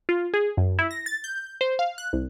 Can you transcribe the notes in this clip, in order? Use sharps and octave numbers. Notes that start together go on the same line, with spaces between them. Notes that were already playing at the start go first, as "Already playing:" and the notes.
F4
G#4
F#2
E4
A#6
A6
G6
C5
F5
F#6
C2